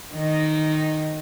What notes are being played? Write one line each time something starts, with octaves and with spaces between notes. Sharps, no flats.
D#3 D#4